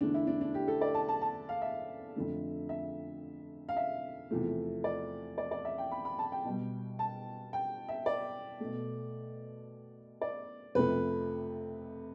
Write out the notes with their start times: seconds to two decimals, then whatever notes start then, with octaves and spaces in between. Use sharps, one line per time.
0.01 E2 D3 A3 D4
0.14 E4
0.27 D4
0.41 D4
0.54 G4
0.68 A4
0.81 D5
0.94 A5
1.09 A5
1.22 A5
1.49 F5
1.62 E5
2.16 F2 D3 A3
2.69 E5
3.69 F5
3.77 E5
4.31 E2 C3 F3 A3
4.84 D5
5.38 D5
5.51 D5
5.65 E5
5.78 G5
5.92 B5
6.05 B5
6.19 A5
6.32 G5
6.45 B2 G3
6.99 A5
7.53 G5
7.89 E5
8.06 D5
8.60 B2 A3
10.21 D5
10.75 F2 C3 F3 A3 B4